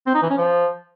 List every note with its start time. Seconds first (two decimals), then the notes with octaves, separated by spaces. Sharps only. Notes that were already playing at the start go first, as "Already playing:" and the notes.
0.07 C4
0.15 D#4
0.22 E3
0.30 C#4
0.38 F3